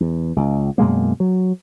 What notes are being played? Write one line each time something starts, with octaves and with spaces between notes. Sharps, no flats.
E2
C#2
F#2 B2 G#3 A#3
F#3